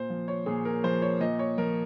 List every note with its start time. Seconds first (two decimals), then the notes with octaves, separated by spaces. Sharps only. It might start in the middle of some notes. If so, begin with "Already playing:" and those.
Already playing: A#2 C5
0.10 F3
0.28 C#5
0.46 A#2 G#4
0.65 A#4
0.84 F3 C5
1.02 C#5
1.20 A#2 D#5
1.39 C#5
1.58 F3 A#4